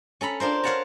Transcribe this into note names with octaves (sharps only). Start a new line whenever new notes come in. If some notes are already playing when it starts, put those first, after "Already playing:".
C#4 A4 A#5 B5
D4 F4 A#4 C5
A#4 C#5 F5 F#5 A5 A#5